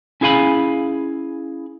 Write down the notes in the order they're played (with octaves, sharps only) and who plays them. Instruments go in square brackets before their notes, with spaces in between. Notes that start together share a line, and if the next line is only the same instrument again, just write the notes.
[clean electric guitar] C#4 E4 G#4 F5 G#5 B5